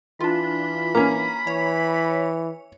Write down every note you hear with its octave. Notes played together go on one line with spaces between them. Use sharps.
E3 D4 F4 B5
A#3 C#4 A#5
E3 C#5